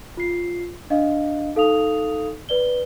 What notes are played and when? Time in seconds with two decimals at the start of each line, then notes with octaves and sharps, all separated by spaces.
0.17 F4 C7
0.90 D4 D#5 F5
1.55 D#4 A4 F5 D#6 F7
2.49 B4 D5 G7